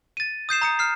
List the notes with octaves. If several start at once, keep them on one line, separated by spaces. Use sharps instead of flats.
A6 D#7
D#6 G6 C7 E7
A#5 D#6 C#7
F6 C7